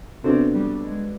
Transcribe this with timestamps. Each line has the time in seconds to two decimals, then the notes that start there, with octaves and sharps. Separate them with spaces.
0.23 C3 B3 C4 D4 F#4 A4
0.54 G3
0.83 G#3